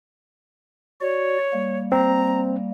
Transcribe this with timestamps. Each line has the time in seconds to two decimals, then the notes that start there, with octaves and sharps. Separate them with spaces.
1.01 F#4 C#5 D5
1.53 G3 A#3
1.92 C4 A#5